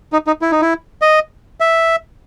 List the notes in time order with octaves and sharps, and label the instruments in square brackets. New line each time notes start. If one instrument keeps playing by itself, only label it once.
[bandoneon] D#4
D#4
E4
D#4
E4
D#5
E5